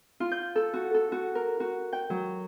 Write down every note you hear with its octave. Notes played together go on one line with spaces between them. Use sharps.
F4
G6
A4
F#4
A4
F#4
A#4
F#4
G5
F#3